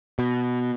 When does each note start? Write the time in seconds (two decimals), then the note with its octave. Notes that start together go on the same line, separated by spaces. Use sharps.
0.19 B2